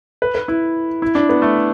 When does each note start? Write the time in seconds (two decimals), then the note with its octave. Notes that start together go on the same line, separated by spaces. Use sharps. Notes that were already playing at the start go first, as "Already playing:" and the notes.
0.22 B4
0.35 B4
0.48 E4
1.02 E4
1.15 D4
1.29 B3
1.42 A3